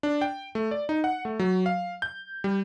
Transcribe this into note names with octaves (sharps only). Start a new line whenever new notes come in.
D4
G5
A3
D5
D#4
F#5
A3
F#3
F5
G6
G3